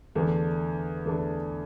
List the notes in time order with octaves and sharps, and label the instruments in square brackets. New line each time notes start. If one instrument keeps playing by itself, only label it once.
[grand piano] E2 D3 A3 D4
E2 D3 A3 D4